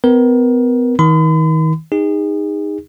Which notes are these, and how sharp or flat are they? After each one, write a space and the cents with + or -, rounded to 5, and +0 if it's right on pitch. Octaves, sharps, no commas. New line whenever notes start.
B3 +40 A#4 +25
D#3 +35 B5 +45
D#4 +0 G#4 -35